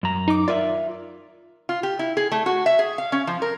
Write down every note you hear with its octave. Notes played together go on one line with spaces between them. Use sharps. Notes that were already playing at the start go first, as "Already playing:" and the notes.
F#2 A#5
D#4 D6
F4 A#4 D5 E5
F4
G4
E4
G#4
A3
F#4
E5
G#4
F5
C#4
F3
A#4